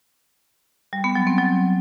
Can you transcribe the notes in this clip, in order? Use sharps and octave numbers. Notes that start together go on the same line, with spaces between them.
G3
B3
F#3
C4
F#3